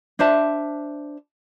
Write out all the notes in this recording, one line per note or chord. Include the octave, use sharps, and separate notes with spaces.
D4 C5 E5 A5